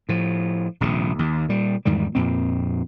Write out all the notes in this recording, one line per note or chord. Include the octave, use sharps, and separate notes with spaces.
A2 F3
D#1 A#1 C3
D#2
A#2 G3
E2 G#2 D#3 G3
F2 A#2 C4